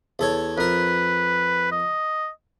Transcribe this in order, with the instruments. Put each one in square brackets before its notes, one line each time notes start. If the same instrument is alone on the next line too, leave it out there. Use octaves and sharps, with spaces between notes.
[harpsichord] E2 A4 C#5
[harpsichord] F2 A#4 [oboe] B4
[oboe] D#5